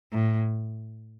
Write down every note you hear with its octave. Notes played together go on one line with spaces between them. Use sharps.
A2